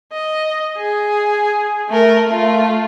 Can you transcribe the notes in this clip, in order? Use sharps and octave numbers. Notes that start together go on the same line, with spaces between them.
D#5
G#4
A3 A#4
A3 F4